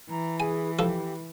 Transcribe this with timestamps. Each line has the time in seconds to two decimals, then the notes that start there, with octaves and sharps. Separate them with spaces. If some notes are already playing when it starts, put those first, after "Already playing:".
0.11 E3 A#5
0.40 G#4 G#5
0.79 F3 G4 A4